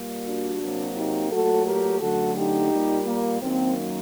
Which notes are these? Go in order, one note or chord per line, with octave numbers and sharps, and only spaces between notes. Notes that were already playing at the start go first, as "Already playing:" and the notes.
Already playing: A#2 G3 A#3
D4 F#4
C3 F#3 A#3
D#4 G4
A#2 F#3 A3 F#4 A4
G4 A#4
F#2 D3 F#3 A3 F#4 A4
D#4 G4
A#2 G3 A#3
A#3
F#2 D#3 F#3 A#3 C4